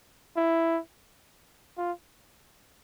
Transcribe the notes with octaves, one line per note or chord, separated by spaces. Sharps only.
E4
F4